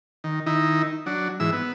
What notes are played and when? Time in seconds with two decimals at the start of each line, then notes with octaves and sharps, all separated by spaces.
0.24 D#3
0.46 D#3 D#4 E4
1.06 F#3 D4
1.40 G#2 E3 E6
1.53 B3